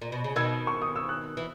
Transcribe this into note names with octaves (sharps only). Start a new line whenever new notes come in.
A#2
B2
C#3
B2 D#3 E6 G#6
C#6
D#6
E6
D#6 F#6
E3